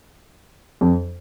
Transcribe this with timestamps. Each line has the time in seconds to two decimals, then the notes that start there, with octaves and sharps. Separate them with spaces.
0.81 F2